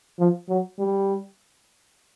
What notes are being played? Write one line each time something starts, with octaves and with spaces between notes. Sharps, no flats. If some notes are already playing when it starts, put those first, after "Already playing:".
F3
F#3
G3